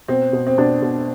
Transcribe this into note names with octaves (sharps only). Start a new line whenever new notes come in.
B2 C4
B2
C4
B2 D4
B2